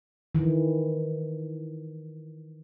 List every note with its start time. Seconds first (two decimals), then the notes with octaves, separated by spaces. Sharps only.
0.35 D#3 E3